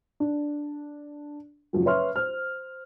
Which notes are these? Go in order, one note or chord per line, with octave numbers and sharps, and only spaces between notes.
D4
F#1 F3 F#3
B4 C#5 E5 C6 C#6 F6
C5 F6